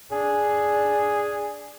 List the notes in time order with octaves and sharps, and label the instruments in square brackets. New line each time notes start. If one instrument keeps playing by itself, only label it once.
[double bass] D4 [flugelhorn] G#4